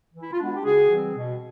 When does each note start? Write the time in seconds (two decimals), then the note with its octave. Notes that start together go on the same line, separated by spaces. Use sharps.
0.14 E3
0.21 E4
0.32 F4
0.39 G#3 B3 D4 F#4
0.54 G4
0.64 C#3 F#4 G#4
0.90 E3 G3 C4
1.15 B2